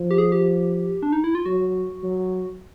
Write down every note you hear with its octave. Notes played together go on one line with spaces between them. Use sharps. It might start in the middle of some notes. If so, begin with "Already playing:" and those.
Already playing: F3
G4
G#4
G4
D4
D#4
E4
F4
F#3 F#4
F#3